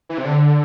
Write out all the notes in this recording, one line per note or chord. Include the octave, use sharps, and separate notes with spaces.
E3
C3
D3